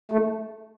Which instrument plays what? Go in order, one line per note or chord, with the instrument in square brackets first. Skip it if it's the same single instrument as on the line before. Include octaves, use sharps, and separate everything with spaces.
[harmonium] A3